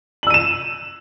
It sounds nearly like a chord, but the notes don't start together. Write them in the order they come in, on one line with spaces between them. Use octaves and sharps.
F#7 E6 D#7 E7